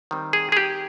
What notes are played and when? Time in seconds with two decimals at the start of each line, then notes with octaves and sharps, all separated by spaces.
0.11 D#3 G3 C4
0.33 G#4
0.52 G#4
0.57 G4